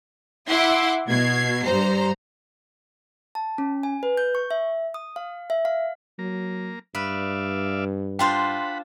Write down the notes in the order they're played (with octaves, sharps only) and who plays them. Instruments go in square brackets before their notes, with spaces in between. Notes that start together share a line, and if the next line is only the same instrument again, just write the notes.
[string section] E4 E5 F#5 C6 D6
B2 G#6 C7
G2 C5 A#5
[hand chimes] A5
C#4
G#5
B4
G6
C#6
E5
D#6
F5
E5
F5
[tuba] F#3 [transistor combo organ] A#3 A#5
[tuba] G2 [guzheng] B4 [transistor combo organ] D5 E5 F5
[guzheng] D4 F4 C5 [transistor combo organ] F#5 B5 [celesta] G5 C6